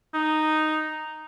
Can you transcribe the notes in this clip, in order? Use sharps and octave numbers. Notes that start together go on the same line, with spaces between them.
D#4